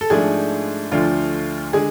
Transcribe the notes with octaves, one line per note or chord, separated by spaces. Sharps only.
A4
G#2 F3 A3 D4 G#4
D2 D3 F3 A3 D4 F4
D3 G#3 G#4